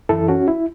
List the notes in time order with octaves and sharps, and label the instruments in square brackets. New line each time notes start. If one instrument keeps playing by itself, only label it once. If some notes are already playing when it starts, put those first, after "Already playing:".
[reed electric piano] F#2 E3 E4 A4
C#4 F#4
E4